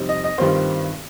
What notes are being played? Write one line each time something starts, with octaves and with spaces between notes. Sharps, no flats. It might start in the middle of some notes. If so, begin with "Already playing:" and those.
Already playing: F2 C3 G3 C4 D#4
D#5
D#5
G2 D#3 G3 C4 F4 C5